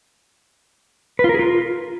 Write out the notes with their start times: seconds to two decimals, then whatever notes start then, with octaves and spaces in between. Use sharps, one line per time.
1.19 B4
1.24 F4
1.29 A#4
1.34 G#4
1.39 F4